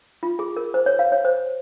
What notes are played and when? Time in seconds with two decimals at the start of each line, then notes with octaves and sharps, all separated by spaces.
0.23 F4
0.39 G#4
0.57 A#4
0.74 C5
0.86 C#5
0.99 F5
1.12 C#5
1.25 C5